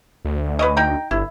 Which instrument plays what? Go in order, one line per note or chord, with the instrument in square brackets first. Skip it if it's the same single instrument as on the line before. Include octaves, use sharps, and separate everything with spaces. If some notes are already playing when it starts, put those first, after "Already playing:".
[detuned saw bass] D2
[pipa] B4 C#5 D#5
D#4 G5 A#5
[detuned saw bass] G1 [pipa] E4